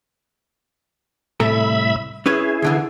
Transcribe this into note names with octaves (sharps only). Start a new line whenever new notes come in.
C2 A2 A4 E5 A#5 B5
C#4 E4 G#4 B4 C#5
D2 D3 E3